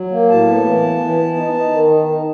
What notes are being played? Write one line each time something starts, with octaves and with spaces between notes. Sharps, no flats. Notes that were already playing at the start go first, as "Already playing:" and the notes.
Already playing: F#3
A#3
A2 A5
B3
E3
B3
E3
B3
D#4
D#4
D#3
D#4
D#4